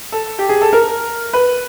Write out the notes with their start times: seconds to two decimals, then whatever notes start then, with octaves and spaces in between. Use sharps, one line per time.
0.12 A4
0.39 G4
0.49 G#4
0.62 A4
0.73 A#4
1.33 B4